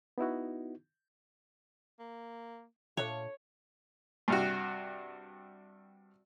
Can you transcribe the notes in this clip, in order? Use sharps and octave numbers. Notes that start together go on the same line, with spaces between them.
B3 D#4 E4 F#4
A#3
A#2 D3 A3 D4 F4 C#5
G2 C3 F#4